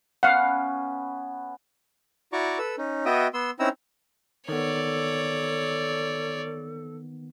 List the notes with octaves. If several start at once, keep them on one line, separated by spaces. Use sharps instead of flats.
B3 C#4 B4 F5 F#5
E4 F#4 D5 A#5 C#6 D6
A4 B4 E6
C#4 D#4
B3 F#4 D#5 E5 G5 D#6
B3 C6 E6
C4 C#4 D#4 E4 A#5 E6
D#3 B3 A4 C#5 D5